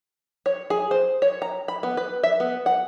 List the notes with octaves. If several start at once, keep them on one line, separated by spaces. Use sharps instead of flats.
C#5
G#4
C5
C#5
A#5
B5
B3
B4
E5
B3
F#5